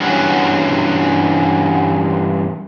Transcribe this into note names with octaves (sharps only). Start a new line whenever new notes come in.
G2 E3 B3 C#4 F#4